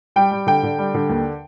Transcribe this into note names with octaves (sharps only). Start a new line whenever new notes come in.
G3 G5
G3
D3 G5
D3
G3
D3
D#2